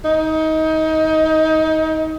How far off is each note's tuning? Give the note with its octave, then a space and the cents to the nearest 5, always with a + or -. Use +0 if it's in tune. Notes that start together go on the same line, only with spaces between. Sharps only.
D#4 +25